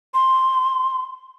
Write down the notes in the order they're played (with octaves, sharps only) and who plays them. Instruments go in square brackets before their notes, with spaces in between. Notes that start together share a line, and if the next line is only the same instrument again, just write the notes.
[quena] C6